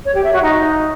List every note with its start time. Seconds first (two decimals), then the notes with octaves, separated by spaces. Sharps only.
0.05 C#5
0.15 G4
0.24 E5
0.33 F#4
0.42 D#4